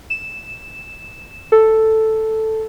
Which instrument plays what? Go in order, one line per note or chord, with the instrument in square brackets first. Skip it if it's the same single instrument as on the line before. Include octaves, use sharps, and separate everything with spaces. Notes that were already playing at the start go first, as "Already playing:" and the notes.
[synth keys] E7
A4